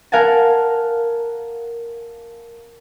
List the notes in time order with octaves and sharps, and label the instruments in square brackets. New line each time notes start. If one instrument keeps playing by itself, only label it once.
[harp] A#4 F5 F#5 G#5 A5